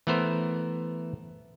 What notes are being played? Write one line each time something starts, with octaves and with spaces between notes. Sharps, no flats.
E3 A3 B3 A#4 C5